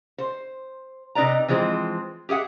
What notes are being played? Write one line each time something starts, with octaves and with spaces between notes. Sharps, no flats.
C5
C3 D#4 B4 D5 A#5
E3 F3 G#3 C4
G4 G#4 E5 F#5